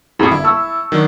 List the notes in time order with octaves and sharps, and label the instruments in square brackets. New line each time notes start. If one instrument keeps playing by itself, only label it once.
[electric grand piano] F2 A2 [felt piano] F#4 G#4 B5
[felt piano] G1 [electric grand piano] E4
[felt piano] A5 C#6 E6
[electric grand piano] D#3 F#3 D4